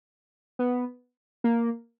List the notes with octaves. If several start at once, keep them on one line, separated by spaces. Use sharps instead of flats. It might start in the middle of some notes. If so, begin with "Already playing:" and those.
B3
A#3